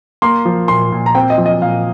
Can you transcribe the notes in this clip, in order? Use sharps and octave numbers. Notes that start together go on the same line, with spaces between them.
A#3 C6
F3
A#2 C6
A#2
A#5
C4 G5
D#5
F3
D#5
A#2 F5